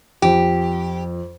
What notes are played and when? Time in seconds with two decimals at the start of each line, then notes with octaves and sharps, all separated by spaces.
0.22 F2 G4